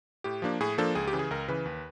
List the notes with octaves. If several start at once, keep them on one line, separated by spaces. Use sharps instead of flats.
A2 G4
F3 A#3 D4
A2 G#4
F3 A#3 D4 A4
C#2 G#4
G4
C#3 E3
G#4
C#2 A#4
C#3 E3 B4
D#2